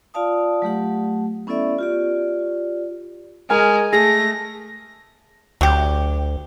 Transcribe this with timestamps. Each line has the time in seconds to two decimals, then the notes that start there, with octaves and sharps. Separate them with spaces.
0.14 F4 D5 F5 A5 D#6
0.62 F#3 A3 G4 F#5
1.47 B3 C#4 E4 A4 D5 E5
1.79 F4 G4 D5
3.50 G#3 A#4 G#5 F6
3.93 A3 G#4 A#6
5.61 D2 F#3 G4